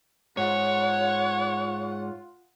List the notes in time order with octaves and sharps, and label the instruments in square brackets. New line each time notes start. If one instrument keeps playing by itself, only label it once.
[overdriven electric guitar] G#2 [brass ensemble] F4 [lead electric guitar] C#5 [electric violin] F#5